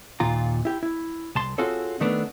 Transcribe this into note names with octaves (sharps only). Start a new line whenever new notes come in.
D#2 A#2 F4 A#5
E4 G4
E4
C2 A5 C6
C4 F4 F#4 G#4 A4 C#5
D#3 A3 B3 C4 D4